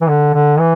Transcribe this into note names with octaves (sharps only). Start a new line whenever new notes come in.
E3
D3
D3
E3